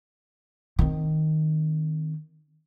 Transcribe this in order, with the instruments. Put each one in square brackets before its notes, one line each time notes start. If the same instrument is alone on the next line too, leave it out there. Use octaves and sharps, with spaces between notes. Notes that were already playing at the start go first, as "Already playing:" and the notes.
[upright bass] D#3 C4